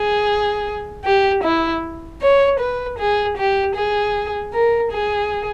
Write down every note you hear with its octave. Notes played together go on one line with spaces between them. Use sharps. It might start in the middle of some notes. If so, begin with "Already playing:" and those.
Already playing: G#4
G4
E4
C#5
B4
G#4
G4
G#4
A#4
G#4